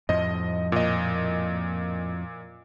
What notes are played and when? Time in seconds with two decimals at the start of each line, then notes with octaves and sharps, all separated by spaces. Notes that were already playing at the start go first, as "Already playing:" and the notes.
0.09 F2 A2 F3 D#5
0.72 A#2 D#5